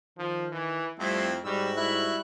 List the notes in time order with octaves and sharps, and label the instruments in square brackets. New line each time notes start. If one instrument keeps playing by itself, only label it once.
[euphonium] D#3 [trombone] F3
[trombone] E3
[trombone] F2 [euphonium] G3 [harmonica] A3 C4 E4
[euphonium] G#2 [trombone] G3 [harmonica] F#4 [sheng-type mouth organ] E6
[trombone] G3 [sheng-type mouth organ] E4 E5 F#6